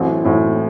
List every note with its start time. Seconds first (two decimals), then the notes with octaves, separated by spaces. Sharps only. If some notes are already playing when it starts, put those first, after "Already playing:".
Already playing: A1 A2 F#3 C4
0.24 A1 A2 F#3 C4